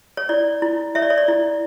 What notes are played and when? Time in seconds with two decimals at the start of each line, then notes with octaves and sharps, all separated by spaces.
0.17 C#5
0.29 E4 D5
0.62 E4
0.95 C#5 E5
1.02 D5
1.10 C#5
1.18 D5
1.28 E4